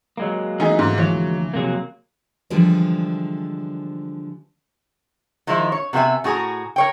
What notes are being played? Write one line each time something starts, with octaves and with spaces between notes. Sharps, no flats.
F#3 G#3 A#3
E3 A3 B3 D#4 G#4
G#2
D2 E3 F3 C#5
F2 C3 F#3 A#3 G#4
D3 E3 F3 G3 G#3
D#3 F3 G#3 E4 F4
C#5
C3 B3 F#4 E5 G#5
A2 F#4 G#4 G#5 A#5
A#4 C#5 G5